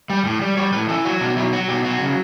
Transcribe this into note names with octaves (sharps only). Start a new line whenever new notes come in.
G3
A2
G3
G3 C#5
A2 B4
E3 A4
F#3 F#4
B2 D4
F#3 E4
F#3 F#4
B2 G4
F#3 F#4
C#3